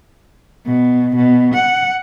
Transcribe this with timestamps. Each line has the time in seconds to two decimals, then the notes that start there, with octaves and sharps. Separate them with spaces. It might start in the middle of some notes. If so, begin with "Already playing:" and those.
0.65 B2
1.15 B2
1.54 F#5